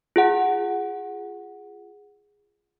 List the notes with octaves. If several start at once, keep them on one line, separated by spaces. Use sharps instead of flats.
F4 G#4 F#5